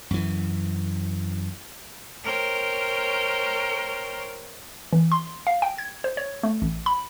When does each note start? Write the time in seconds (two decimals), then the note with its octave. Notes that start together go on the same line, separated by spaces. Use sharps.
0.11 F#2 E3
2.23 A#4 C5 C#5 G5
4.93 E3
5.12 C6
5.47 F5
5.62 G5
5.78 G#6
6.04 C5
6.17 C#5
6.43 A3
6.62 A1
6.86 B5